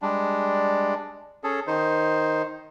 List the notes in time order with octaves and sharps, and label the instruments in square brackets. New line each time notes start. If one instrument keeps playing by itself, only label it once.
[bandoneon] G3 G#3 D4
C#4 G#4 A4
D#3 D#4 C5